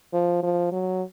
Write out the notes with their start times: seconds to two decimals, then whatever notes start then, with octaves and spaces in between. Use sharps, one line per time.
0.13 F3
0.43 F3
0.72 F#3